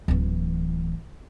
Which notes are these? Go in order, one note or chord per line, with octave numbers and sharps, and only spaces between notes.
D1 E3